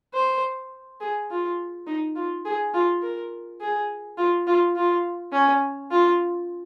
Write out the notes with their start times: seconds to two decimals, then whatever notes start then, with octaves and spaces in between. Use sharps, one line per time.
0.14 C5
1.01 G#4
1.30 F4
1.87 D#4
2.16 F4
2.45 G#4
2.74 F4
3.02 A#4
3.61 G#4
4.17 F4
4.47 F4
4.76 F4
5.32 C#4
5.91 F4